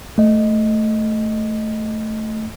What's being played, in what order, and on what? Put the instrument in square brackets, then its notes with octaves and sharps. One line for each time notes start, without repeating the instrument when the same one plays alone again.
[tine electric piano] A3 D#5